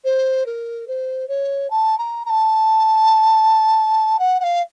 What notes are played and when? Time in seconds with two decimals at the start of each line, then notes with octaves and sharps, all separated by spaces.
0.04 C5
0.46 A#4
0.87 C5
1.28 C#5
1.70 A5
1.98 A#5
2.25 A#5
2.29 A5
4.19 F#5
4.40 F#5
4.43 F5